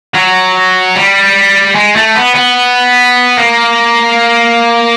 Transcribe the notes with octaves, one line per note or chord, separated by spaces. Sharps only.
F#3
G3
G#3
A3
B3
B3
A#3